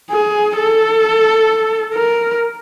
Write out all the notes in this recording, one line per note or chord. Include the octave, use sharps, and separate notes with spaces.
G#4
A4
A#4